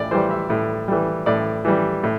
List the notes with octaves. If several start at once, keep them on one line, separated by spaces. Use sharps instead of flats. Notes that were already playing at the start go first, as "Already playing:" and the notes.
Already playing: A2 D5
E3 G3 C5
E5
A2
E3 G3
A2 D5
E3 G3
A2